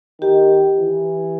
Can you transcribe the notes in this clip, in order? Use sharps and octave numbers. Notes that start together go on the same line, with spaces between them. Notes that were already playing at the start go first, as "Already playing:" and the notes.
D#3 G4
E3